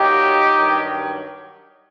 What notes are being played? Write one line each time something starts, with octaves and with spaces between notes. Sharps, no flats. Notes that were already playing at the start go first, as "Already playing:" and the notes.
Already playing: A#2 F#3 D#4 G4
G2 D#3 F#3